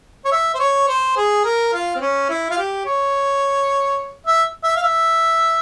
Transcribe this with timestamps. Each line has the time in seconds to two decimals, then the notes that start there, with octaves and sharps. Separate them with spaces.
0.25 C#5
0.32 E5
0.54 C5
0.60 C#5
0.87 C5
1.16 G#4
1.45 A#4
1.73 F4
1.95 C4
2.01 C#4
2.29 E4
2.50 F4
2.58 G4
2.86 C#5
4.26 E5
4.63 E5
4.76 F5
4.83 E5